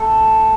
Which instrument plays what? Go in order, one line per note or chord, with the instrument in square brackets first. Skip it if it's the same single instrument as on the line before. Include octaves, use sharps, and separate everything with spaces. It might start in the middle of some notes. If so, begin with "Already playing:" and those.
Already playing: [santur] A3 A4